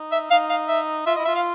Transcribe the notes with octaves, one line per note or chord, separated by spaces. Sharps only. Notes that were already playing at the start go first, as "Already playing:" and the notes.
Already playing: D#4
E5
D#4 F5
F5
E5
F4 E5
E4 D#5
F4 E5
F5